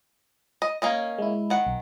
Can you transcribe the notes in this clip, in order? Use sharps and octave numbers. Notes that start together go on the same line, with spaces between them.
D#5
A#3 C#4 D#5
G#3 E4
D#3 F#5
B1